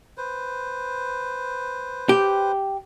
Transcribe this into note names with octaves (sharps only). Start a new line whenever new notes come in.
B4 C5
G4